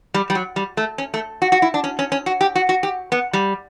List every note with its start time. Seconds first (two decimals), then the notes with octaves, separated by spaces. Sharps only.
0.14 G3
0.30 G3
0.35 F#3
0.56 G3
0.77 A3
0.98 C#4
1.14 A3
1.42 F#4
1.52 F#4
1.62 E4
1.74 D4
1.84 C#4
1.99 C#4
2.12 C#4
2.26 F#4
2.41 G4
2.55 F#4
2.69 F#4
2.83 G4
3.12 B3
3.33 G3